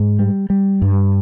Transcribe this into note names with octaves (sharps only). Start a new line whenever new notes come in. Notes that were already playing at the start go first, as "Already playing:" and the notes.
Already playing: G#2
G3
G3
G2